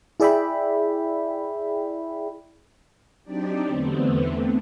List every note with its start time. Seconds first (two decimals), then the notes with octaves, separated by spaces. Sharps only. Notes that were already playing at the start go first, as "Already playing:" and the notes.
0.20 E4 G#4 D5 E5 G5 B5
3.24 F#3 C4 D4 D#4 G4 D5
3.66 E2 D3 A3 B3 C4